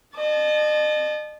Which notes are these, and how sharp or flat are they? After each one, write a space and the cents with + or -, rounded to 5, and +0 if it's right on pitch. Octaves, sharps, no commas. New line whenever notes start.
D#5 -40 A5 -25